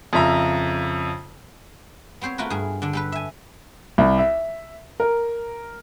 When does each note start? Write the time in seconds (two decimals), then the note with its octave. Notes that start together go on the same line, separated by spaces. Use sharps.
0.13 F2 C#3 E5 A#5
2.21 B3 C4 C5 C#5
2.38 A3 F4 F#4 A#4 B4
2.50 G2 G#4
2.82 D3 D4
2.93 G3 A4 B4
3.12 E5 G#5
3.98 C2
4.18 E5
5.00 A#4